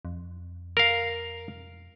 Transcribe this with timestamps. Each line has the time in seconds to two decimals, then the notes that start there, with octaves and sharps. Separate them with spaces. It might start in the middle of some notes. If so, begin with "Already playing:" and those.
0.05 F2
0.77 A#4 F5